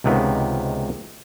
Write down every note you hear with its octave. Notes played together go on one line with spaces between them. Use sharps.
C#2 C3 D#3 B3